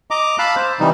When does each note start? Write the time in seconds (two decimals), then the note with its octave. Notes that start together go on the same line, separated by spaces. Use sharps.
0.11 D#5 A#5 D6
0.39 F5 A5 B5 E6 F#6
0.56 C5
0.80 C3 E3 G3 D#4